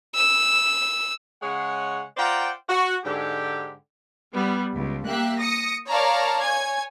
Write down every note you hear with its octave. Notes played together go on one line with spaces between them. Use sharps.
E6
C#3 G#3 G#4 C#5 F#5
F4 C5 D5 F#5 G5 A#5
F#4
G#2 D3 G4
G3 B3
C#2
A#3 G4 E5 F#6
D#6 A#6 C#7
A#4 C#5 D5 F5 A5 A#5
C#5 G#5 G#6